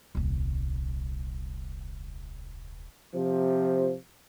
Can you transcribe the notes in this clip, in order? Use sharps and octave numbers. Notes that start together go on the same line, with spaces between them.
D#1 C2
C3 F3